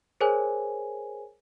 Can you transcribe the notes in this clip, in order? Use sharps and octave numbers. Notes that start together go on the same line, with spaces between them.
G#4 A#4 C5 C#5 G#5